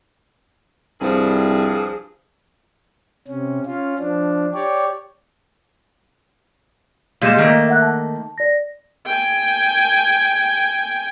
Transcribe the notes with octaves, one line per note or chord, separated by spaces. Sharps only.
C2 G2 F3 G#4
C3 C#4
C#4 F4
F3 D4
G4 C#5 D5
A#2 G3 G#3 F5 G6 E7
D#3 A3 A#3
E5 F#5 F#6
A5
D5 A#6
G5 G#5